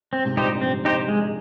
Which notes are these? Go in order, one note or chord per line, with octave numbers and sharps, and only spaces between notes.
C4
G#2 C3
G2 A#2 D#4 G4 C5
G2
F2 G#2 C4
D#4 G4 C5
G#3